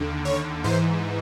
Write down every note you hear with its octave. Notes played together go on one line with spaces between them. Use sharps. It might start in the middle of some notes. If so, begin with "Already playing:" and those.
Already playing: D#2 D3
C#5
G#2 E3 C5